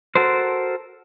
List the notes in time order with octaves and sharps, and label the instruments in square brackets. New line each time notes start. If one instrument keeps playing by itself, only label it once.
[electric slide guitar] F#4 A4 A#4 C5